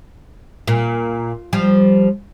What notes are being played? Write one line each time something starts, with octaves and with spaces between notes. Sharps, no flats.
A#2
F3 G3